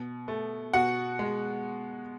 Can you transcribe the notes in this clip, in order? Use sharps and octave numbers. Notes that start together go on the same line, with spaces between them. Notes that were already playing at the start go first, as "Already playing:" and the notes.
Already playing: B2
A3
B2 F#4 F#5
G#3